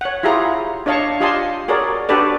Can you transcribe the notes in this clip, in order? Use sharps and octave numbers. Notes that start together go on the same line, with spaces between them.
C#5 F#5
E4 F4 G4 G#4 A#5
D4 C#5 D#5 F5 A5 C#6
F4 G4 D#5 G#5 A5 C6
F#4 G#4 A#4 C#5 D5
D4 F#4 G4 A4 B4 D5